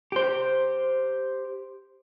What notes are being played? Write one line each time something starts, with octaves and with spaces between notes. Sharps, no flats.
G4 C5